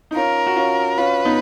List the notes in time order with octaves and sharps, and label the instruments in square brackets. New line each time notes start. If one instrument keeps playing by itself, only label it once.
[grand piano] D#4
[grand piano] C#4 F4 [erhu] A#4
[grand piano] F#4
C#4 F4
[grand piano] C#4 F4 [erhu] B4
[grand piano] B3 D#4